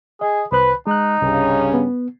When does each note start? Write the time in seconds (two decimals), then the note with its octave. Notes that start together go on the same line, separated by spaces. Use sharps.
0.21 G#4 D#5
0.52 C2 B4 C5 F#6
0.87 G#3 D#4 F#6
1.22 C2 G2 C#3 C#4
1.74 B3